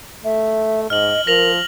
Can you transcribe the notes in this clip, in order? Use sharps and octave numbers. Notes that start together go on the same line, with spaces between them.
A3 E5
G#2 D#5 F6 F#7
F3 A#4 A#6 F7 F#7